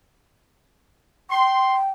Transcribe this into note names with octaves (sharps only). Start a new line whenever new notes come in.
G5 C6